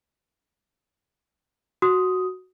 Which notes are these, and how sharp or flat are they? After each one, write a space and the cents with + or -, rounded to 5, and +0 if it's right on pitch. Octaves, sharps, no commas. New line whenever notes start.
F#4 +0 D#6 +5